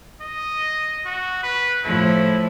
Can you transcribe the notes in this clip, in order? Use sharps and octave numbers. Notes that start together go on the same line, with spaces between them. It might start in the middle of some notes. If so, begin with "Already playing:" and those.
D#5
F#4
B4
A2 F3 E4